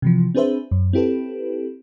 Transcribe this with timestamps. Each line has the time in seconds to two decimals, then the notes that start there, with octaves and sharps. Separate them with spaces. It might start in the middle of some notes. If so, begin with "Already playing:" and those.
0.02 C3 E3 F3
0.35 C4 D4 G#4 B4 C5 E5
0.71 F#2
0.93 C4 E4 G4 A4 B4